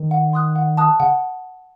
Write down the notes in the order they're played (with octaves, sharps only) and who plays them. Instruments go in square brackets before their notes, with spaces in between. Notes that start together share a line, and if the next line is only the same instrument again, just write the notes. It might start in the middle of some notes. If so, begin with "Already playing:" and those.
Already playing: [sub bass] D#3
[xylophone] F#5
C6 D#6 F#6
F#5
A5 D#6 F#6
[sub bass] C#3 [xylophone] F#5